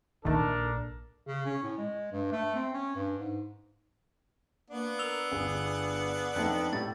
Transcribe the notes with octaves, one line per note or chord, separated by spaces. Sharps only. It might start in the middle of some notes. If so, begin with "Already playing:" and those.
A#1 A#2 D#3 A3 D4 A4 A#4
C#3
C#4
A2
G#3
G2
A3
C4
C#4
G2
G#2
A#3 B3 D4 F#5
A#4 E6 F7 G7
G1 G#4
F2 A3 D#4
A2 G4 A6